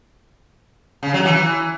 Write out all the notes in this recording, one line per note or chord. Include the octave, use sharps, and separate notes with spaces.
C#3
F#3
E3